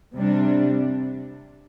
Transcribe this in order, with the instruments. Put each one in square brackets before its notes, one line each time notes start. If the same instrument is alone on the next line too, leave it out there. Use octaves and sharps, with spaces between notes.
[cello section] C3 G3 D4